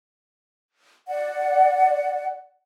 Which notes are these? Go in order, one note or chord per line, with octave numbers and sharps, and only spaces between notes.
D5 F#5